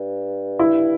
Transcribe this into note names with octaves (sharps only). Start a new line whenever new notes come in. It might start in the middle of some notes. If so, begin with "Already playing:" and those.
Already playing: G2
E4